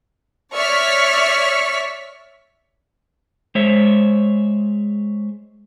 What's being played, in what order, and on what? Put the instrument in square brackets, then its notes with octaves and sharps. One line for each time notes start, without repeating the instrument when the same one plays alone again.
[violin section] C#5 D5 E5 C#6 F6 B6
[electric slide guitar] G#3 C5 C#5 E5